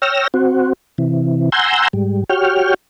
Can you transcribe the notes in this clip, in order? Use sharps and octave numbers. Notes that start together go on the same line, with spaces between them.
C#5 G5 E6 F6 A#6
C4 F#4
C3 E3
F#5 G#5 A#5 C6 E6 G6
G#2 G3
F#4 G4 C#5 G5 F6